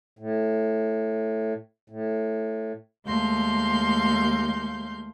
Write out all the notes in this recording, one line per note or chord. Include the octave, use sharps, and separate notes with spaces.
A2
A2
D#2 G#3 A3 F5 C6 G6